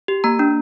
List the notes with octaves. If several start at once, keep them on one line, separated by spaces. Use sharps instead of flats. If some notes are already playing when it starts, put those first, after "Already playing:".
G4
A#3 A#5
D4